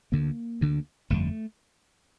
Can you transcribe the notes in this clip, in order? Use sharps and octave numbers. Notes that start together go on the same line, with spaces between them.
D2 D3 A#3
D2 D3
G1 F2 D3 A3